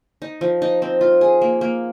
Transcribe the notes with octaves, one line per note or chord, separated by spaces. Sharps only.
D#4
F3
D#4
C4
F4
G#4
A#3
A#3